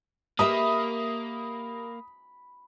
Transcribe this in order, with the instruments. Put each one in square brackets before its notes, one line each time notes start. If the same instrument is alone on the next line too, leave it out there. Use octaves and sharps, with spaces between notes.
[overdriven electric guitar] A#3 [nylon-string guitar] G4 A#4 E5 [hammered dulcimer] B5 [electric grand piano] D#6